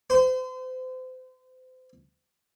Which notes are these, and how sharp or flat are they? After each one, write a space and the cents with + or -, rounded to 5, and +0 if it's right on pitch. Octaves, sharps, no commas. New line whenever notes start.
C5 -35